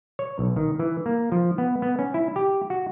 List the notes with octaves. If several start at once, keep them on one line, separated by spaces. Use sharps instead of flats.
C#5
B1
D#3
E3
A#3
F3
B3
B3
C#4
E4
G4
F#4